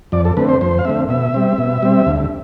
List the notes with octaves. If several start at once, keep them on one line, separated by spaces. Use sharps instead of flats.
F2 D5
A4
D3 A3 C4 B4
C5
F2 C5
F5
D3 A3 C4 E5
B2 E5
G3 C4
B2
G3 C4
D2